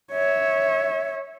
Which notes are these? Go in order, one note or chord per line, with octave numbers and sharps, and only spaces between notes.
C#5 E5